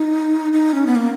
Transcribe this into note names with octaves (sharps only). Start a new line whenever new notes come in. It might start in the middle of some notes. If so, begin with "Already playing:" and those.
Already playing: D#4
D#4
C#4
B3
A#3